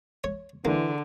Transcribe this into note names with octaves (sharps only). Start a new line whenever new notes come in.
C#5
D3 E3 A#3